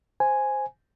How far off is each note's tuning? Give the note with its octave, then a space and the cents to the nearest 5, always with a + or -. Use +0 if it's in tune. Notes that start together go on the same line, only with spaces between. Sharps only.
C5 +0 G#5 +0